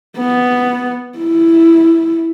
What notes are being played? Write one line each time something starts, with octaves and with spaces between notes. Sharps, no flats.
B3
E4